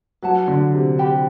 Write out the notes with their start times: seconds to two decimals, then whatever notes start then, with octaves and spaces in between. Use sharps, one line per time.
0.23 F#3 B4 F#5 A5
0.48 D3
0.73 C3
0.98 G4 C5 G5 B5